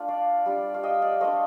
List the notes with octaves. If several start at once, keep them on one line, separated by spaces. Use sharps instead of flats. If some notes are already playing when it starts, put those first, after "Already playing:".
Already playing: A3 D4 F4
D5 F5
G3 D4 F4
F5
D#5 G5
D5 F5
A3 D4 F4 C5 D#5